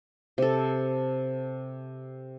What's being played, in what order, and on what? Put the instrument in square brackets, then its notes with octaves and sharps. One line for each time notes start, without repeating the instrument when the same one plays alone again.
[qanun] C3 A4